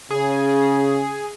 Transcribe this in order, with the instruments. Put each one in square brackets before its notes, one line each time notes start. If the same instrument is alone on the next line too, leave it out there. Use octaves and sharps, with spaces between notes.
[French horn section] C#3 [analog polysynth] G#4